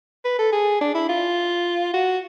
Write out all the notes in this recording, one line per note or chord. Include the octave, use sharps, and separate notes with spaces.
B4
A4
G#4
D4
E4
F4
F#4